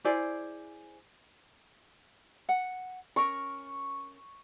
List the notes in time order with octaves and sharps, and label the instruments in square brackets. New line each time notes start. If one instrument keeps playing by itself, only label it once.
[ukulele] E4 G#4 C5 D5
F#5
[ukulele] C#4 A#4 [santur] C#6